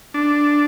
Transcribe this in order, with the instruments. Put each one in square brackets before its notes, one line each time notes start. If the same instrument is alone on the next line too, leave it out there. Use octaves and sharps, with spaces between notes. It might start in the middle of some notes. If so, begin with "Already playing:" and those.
[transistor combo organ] D4